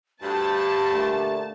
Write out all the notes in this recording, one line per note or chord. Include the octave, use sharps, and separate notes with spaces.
D2 G2 G4 A5
A#2 D3 A3